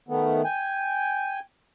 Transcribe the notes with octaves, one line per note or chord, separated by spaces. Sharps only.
D#3 A3 B3
G5 G#5